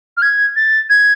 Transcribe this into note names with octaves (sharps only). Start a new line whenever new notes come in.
F6
G#6
A6
G#6